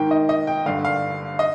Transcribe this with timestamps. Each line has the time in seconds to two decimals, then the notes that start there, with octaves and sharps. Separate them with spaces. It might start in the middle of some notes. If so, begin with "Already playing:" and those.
Already playing: G#2 D#3 G5
0.11 D#5
0.29 D#5
0.47 G5
0.66 G2 D3 F5
0.85 F5
1.39 D#5